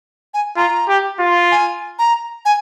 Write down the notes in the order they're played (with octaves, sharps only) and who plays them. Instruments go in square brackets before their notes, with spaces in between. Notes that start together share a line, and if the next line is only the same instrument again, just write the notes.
[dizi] G#5
[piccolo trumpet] F4 [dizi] A#5
[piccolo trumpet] G4
F4
[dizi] G#5
A#5
G#5